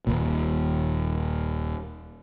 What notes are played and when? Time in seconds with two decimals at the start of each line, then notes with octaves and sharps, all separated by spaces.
0.07 D#1 G#1 A#2